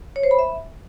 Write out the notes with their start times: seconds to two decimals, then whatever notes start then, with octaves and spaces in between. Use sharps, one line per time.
0.16 C#5
0.23 C5
0.31 B5
0.39 E5